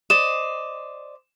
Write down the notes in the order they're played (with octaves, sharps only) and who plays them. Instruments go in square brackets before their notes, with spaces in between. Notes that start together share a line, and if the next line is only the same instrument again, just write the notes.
[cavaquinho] C5 D5 D#5 [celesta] E7